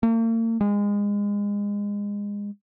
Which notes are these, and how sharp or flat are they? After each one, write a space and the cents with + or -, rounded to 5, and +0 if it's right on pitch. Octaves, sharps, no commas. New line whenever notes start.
A#3 -45
G#3 -25